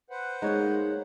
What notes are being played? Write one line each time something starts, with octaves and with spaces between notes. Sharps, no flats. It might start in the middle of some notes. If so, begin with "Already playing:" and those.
B4 C5 F#5
G#3 A#3 D#4 C#5